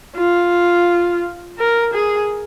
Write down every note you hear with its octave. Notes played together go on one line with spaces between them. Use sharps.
F4
A#4
G#4